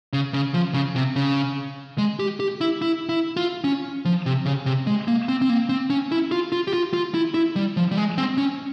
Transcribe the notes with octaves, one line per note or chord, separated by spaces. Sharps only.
C#3
C#3
F3
C#3
C3
C#3
G#3
G4
G4
E4
E4
E4
F4
C#4
F3
C3
C#3
C3
G#3
A#3
C4
C4
A#3
C4
C#4
E4
F4
F4
G4
F4
F4
E4
E4
G3
F3
G3
G#3
C4
C#4